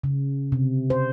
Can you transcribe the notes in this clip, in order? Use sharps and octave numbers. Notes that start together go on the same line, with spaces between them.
C#3
C3
C5